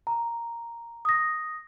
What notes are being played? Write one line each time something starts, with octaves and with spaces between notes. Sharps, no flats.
A#5
D#6 A#6